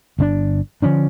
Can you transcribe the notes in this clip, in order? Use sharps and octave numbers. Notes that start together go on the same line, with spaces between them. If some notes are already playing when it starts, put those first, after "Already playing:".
G1 D3 D4
D3 F3 C#4 D4